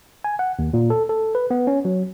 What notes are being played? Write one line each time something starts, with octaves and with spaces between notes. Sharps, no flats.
G#5
F#5
D#2
A#2
A4
A4
B4
B3
C#4
F#3